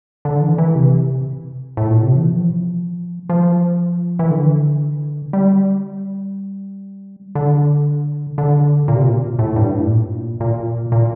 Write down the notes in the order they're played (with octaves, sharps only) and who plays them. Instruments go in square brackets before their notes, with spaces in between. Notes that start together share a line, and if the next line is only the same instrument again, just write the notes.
[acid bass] D3
E3
E3
C3
A2
A#2
C3
E3
F3
F3
E3
D3
G3
D3
D3
A#2
C3
A#2
A2
G2
A2
A#2
A#2
A#2